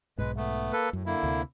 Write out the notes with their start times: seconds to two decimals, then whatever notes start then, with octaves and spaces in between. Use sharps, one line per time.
0.18 B1 G#2 G#3 B4
0.37 A3 B3
0.72 A#3 A4 B4
0.93 F#2 A2
1.06 D3 A#3 E4
1.23 D2 C3